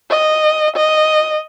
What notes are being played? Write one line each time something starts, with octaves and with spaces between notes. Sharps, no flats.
D#5
D#5